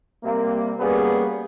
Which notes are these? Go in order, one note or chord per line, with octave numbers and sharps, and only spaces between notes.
C3 G3 A#3
G3 A#3 B3 C#4 G#4